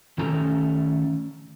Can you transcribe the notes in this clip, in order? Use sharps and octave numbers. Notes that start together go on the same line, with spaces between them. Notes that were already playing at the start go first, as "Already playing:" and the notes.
D#3 A3 C#4 A4 A#5